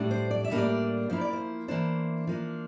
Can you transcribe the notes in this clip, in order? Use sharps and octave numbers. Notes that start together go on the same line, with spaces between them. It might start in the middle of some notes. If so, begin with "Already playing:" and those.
Already playing: A2 G3 D4
C5
D5
E5
A2 G3 A#3 D4
D5
F3 A#3 E4 C5
D5
C5
E3 A#3 D4 C5
F3 A#3 D4